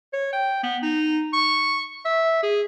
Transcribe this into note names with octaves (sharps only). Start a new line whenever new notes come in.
C#5
G5
B3
D#4
C#6
E5
G#4